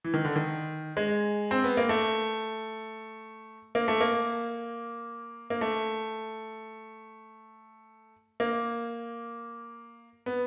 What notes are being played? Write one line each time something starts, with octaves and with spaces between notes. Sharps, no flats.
E3
D#3
D3
D#3
G#3
C4
B3
A#3
A3
A#3
A3
A#3
A#3
A3
A#3
B3